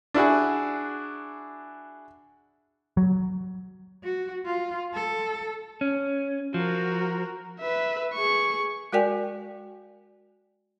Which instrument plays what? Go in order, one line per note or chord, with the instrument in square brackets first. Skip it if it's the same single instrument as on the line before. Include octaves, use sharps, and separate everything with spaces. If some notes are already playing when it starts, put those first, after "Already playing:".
[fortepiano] D4 E4 F#4 G#4
[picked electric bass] F#3
[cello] F#4
F4
A4
[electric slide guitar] C#4
[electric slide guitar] F3 [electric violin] F#4 A#4
[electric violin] B4 E5
G#4 C#6
[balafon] G#3 F#4 A#4 D5 G5 G#5